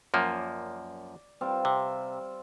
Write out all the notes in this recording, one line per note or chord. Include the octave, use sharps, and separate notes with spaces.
F#2 F3 A#3 D5
G3 C4 F5
C3